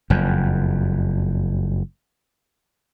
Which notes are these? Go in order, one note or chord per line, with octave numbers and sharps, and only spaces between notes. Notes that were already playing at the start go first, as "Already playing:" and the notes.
F#1 F2